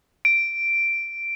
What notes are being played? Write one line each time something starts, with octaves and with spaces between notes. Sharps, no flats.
D7